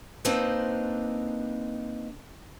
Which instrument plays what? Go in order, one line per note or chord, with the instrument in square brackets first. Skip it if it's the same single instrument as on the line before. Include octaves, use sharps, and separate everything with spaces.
[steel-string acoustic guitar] A#3 C4 D4 D#4 B4 C5